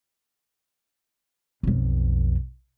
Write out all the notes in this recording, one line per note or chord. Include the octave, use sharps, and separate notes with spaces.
B1 F2